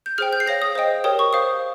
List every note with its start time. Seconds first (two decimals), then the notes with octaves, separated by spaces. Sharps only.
0.06 G6
0.18 G#4 C5 G5 F6
0.33 G6
0.40 C7
0.47 G#4 C#5 F5 A#6
0.62 D#6
0.75 C5 D#5 G5
1.04 G4 A#4 C#5 G5 D#6
1.19 C#6
1.33 C5 F5 D#6